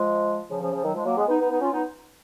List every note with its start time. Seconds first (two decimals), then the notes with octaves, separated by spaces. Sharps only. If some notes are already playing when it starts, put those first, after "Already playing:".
Already playing: F3 G#3
0.50 C#3 F3
0.61 C#3 F3
0.73 C#3 F3
0.84 D#3 F#3
0.94 F3 G#3
1.05 F#3 A#3
1.17 G#3 B3
1.28 B3 D#4
1.39 B3 D#4
1.50 B3 D#4
1.61 C#4 F4
1.72 B3 D#4